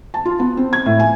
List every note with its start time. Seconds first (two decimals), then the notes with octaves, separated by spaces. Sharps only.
0.14 A5
0.25 F4
0.39 B3
0.57 C4
0.73 G#6
0.86 A2
0.99 G#5